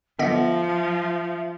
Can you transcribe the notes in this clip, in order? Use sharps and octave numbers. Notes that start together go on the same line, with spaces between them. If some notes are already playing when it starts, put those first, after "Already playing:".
D3 F3 B3 D#5 E5